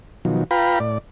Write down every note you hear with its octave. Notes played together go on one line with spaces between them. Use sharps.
B2 D#3 F3 F#3
F4 B4 F5 G5 A#5 B5
A2 D5